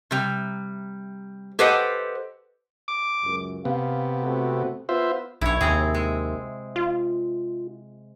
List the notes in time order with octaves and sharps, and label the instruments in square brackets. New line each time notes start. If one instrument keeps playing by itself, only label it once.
[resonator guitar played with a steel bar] C3 G3
G4 A4 B4 C5 D#5 F#5
[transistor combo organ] D6
[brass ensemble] C#2 F#2
[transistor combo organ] C3 B3 [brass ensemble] F5
[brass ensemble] A3 C4 F#4
[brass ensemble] B3 B4 [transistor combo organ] F4 C5 E5
[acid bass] B1 [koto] E4 C#5
[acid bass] D#2 [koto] C3 C4 G#4
[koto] G#3
[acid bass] F4